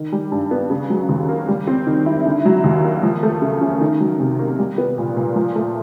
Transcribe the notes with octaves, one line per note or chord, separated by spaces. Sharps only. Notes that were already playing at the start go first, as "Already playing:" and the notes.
Already playing: D#3
G3
G2
B3
C#3
F#3
D#2
A#3
G3
C4
D#3
E4
D3
F#3
D#2
A#3
F3
A3
C#3
C#4
D#3
F#3
C3
A#3
G3
B3
A#2
A#2
F3
A3